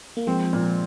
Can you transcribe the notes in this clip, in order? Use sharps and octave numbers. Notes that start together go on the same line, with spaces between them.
A#3
F3 G#3 C4
A#2